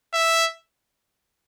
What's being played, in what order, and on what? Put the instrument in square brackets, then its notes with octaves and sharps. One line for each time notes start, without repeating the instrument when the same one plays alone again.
[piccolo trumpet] E5